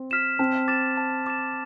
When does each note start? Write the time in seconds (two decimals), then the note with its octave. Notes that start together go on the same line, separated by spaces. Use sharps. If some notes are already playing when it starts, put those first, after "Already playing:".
Already playing: C4
0.11 F6 B6 E7
0.39 C4 A5
0.68 D6 A6 E7
0.97 A5
1.27 D6 A6 E7